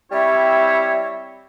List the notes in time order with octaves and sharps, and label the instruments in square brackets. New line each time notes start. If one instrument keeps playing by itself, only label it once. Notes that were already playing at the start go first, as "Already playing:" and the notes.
[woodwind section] G3 C4 E4 C#5 E5